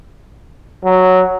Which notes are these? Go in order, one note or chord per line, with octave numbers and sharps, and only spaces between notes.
F#3